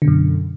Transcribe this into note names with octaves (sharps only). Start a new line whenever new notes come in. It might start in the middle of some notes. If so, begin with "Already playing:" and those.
F#2 B2 D3